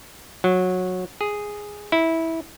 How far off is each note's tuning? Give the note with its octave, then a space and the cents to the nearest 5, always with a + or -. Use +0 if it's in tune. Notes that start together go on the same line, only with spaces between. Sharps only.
F#3 -15
G#4 -5
E4 -15